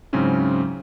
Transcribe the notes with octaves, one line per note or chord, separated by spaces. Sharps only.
G#2 C#3 F#3 C4 C#4 E4